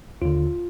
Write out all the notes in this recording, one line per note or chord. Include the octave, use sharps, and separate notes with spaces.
D#2 D3 F4